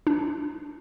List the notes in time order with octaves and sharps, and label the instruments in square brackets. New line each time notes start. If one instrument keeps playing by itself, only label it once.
[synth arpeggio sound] D4